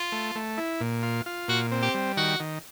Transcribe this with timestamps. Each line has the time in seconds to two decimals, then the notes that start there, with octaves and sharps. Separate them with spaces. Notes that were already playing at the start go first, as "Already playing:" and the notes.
Already playing: F4
0.12 A3
0.35 A3
0.58 E4
0.81 A#2
1.03 F4
1.26 F4
1.48 A#2 F#4
1.72 C4
1.82 G4
1.94 G3
2.17 D#3 F#4
2.40 D#3